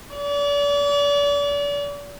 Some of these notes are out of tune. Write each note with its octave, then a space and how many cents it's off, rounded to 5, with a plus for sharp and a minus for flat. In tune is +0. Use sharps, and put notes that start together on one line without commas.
D5 -40